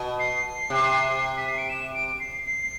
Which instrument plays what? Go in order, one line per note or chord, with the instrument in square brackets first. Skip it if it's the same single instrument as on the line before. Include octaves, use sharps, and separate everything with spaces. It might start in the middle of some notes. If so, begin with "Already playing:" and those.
Already playing: [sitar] B2
[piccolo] C7
[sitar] C3
[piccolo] B6
C7
D7
E7
D7
C7
C7